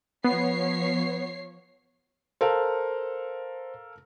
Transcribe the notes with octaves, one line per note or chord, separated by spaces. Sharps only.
F3 B3 C#5 C7
A4 A#4 C5 F5